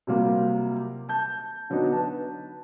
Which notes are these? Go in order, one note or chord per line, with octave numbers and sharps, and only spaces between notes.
C3 F#3 G3 A#3 F4 G4
A5 G6
D3 F#3 B3 D4 D#4
B4 A5